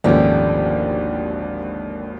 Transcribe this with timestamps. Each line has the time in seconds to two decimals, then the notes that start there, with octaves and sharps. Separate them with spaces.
0.04 G#1 D#2 A#2 D3 F3 A3 C#4 G4